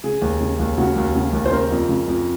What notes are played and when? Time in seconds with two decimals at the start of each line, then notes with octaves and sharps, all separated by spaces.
0.04 C#3 G#4
0.22 D#2
0.40 C#3
0.59 D#2
0.78 C#3 F#4
0.96 D#2
1.15 C#3
1.33 D#2
1.46 C5
1.52 C#3 A#4
1.71 F2
1.89 C#3
2.07 F2